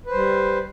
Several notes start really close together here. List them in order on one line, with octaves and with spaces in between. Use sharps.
B4 C5 G3